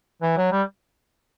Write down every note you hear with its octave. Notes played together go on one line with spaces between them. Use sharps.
E3
F#3
G3